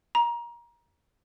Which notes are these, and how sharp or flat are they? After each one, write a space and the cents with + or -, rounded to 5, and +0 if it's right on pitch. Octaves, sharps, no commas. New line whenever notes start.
A#5 +25